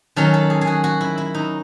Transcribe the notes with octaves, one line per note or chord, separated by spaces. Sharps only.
D#3 F#3 C#4 A4
A4
G#4
G#4
F#4
F#4
E4
E4
D#4